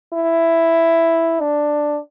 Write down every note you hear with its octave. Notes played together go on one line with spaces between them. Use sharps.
E4
D4